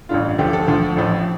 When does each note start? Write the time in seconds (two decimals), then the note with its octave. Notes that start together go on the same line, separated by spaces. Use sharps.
0.09 A1 G2 D3 F4
0.39 D2 D3 F3 G4
0.53 A4
0.67 D2 D3 F3
0.96 A1 A2 F3